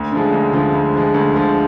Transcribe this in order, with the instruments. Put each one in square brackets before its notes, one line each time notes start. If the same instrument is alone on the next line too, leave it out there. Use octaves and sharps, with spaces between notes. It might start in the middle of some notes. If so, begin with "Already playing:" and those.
Already playing: [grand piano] D2
D3 F3 G#3
D2
D3 F3 G#3
D2
D3 F3 G#3
D2
D3 F3 G#3